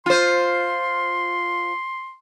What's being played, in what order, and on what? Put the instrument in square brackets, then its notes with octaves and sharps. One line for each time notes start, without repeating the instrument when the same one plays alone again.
[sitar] F4 C5 [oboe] C6